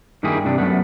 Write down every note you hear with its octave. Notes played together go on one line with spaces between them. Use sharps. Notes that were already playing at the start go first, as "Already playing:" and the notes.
G2 D#3 A#3 E4 G4 G#4
G2 C3 D4
F#2 A3 B3